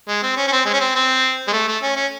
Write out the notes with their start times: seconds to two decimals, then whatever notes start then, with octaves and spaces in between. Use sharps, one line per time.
0.08 G#3
0.23 C4
0.37 C#4
0.47 C#4
0.52 C4
0.66 G#3
0.74 C#4
0.80 C4
0.95 C4
1.48 G#3
1.53 A3
1.68 A3
1.83 C#4
1.96 C#4